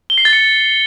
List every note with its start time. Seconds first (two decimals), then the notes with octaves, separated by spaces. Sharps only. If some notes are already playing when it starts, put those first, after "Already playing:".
0.10 G7
0.18 C7
0.25 A6
0.33 C#7